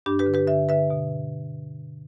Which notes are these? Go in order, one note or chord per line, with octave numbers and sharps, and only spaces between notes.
G2 D4 G4
G4 B4
D3
G4 B4
D3 E5
D3 B4 E5
B2